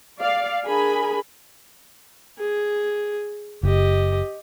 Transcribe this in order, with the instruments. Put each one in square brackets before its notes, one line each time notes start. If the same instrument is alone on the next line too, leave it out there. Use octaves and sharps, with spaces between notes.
[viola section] D5 F5
D4 G#4 A#4 G#5 B5
[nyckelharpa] G#4
[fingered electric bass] F#1 [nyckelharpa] G4 D#5